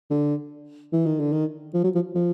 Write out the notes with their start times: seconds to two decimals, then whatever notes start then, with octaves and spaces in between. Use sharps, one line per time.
0.10 D3
0.92 E3
1.06 D#3
1.19 D3
1.32 D#3
1.74 F3
1.84 F#3
1.95 F3
2.15 F3